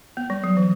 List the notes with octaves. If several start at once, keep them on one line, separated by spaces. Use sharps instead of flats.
B3
G3
F#3
E3